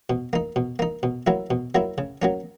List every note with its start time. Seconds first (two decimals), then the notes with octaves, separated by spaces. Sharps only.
0.10 B2
0.33 A#3 D#4
0.56 B2
0.79 A#3 D#4
1.03 B2
1.27 F#3 A#3 E4
1.50 B2
1.75 F#3 A#3 E4
1.98 C#3
2.22 F#3 A#3 C#4